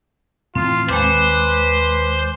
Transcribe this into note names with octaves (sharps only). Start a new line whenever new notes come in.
A2 D#3 E3 C4 F4
D#2 D#3 G#3 B4 C5 D6